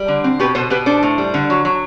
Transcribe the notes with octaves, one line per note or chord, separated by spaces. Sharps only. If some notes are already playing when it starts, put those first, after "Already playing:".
Already playing: G3
D3
C4
B2 G4 B4
B2 A4 C5
B2 G4 B4
D4 A4 C5
A2
G3
D3
F#3
F#3